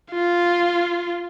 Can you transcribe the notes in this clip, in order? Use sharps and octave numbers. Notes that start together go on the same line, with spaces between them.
F4